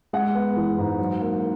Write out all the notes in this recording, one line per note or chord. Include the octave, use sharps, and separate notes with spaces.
G#3 F#5
B3
E3
G#2
F#3
A#3